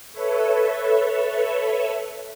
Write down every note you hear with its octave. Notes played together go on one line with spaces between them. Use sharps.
A4 B4 C#5 E5